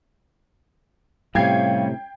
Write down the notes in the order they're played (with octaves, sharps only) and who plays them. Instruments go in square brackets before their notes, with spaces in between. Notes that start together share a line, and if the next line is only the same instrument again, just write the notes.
[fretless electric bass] A2 C3 [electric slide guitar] G3 C#4 [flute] F5 [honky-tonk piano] G5 G#6 C7